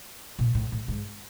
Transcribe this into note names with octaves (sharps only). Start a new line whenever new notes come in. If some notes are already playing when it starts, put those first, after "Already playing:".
A#2
A2
A2
G#2